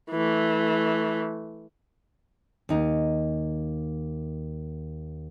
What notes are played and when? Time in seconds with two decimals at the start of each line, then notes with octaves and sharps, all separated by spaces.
0.11 E3 A3
2.69 D#2 D#4